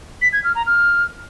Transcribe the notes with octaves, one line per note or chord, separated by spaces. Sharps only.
B6
G#6
F6
A#5
F6